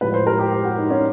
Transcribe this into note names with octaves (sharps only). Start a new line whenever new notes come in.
A2 F3 G#3 B4
C5
A#4
G4
G4
F#4
D#4
C#4